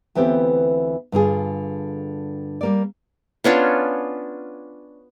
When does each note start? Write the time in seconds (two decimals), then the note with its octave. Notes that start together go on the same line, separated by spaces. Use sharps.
0.15 D2 E3 B3 C4 F4 G4
1.12 G2 D3 F4 G#4
2.61 G3 A#3 D5
3.44 B3 C#4 D4 F4